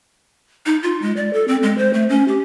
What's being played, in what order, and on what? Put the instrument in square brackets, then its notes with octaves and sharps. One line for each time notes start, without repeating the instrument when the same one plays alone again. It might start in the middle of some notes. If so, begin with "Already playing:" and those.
[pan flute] D#4
F4
G#3
D5
A4
C4
G#3
C5
A3
C#4
G4